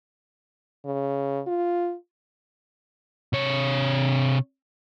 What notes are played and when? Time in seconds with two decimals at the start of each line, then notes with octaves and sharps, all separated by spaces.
0.85 C#3
1.47 F4
3.33 C3 C#5